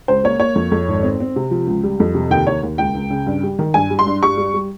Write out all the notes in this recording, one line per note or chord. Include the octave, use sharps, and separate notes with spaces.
C#2 C5
A#3 C#5
A#3 C#5
F2
F2
G#1
C4
C4
C3
F3
C#2
G3
F2
C3
D#2 G5
D#2 C#5
D#2
C#2 G5
C#2
C#3
G2
G3
D#3
G2 G#5
G3
C6
G2
G3 C#6
G3
G3